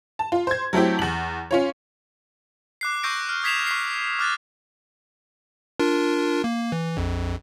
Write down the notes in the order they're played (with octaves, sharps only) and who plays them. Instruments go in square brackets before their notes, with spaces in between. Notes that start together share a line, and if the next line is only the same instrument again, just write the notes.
[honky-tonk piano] A5
F4
C5 G#6
F#3 A3 C4 E4 G4
E2 F#7
C#4 F4 C#5
[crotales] D6 F#6 C7
C#6 E6 G6 A#6 C7 D7
F6
D#6 G#6 B6 C7 E7 F7
C#6 B6 C7
D6 F6 F#6 A6
[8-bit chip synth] D4 F4 A#4
A#3
E3
A#1 F2